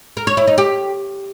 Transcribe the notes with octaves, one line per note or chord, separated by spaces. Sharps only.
A#4
C#5
E4
D#4
G4